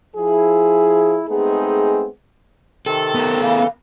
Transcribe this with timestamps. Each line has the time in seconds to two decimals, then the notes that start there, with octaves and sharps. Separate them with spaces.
0.16 F3 E4 G#4
1.28 G#3 A3 B3 C4 D#4 G#4
2.86 C3 D#3 C4 A4
3.15 B3 A#4
3.42 C#3 E3 F5